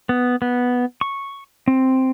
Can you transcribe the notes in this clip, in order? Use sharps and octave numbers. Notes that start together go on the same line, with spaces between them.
B3
B3
C#6
C4